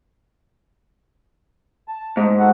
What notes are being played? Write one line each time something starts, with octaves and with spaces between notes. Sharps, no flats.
A5
G#2
F#4 A4 F#5